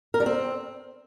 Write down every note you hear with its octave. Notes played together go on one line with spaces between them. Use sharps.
A#4
G3
C4